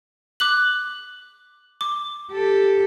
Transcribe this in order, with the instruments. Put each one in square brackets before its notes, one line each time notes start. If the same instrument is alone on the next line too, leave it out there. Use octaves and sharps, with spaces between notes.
[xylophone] D6 F#6 F#7
D6
[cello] G4 A4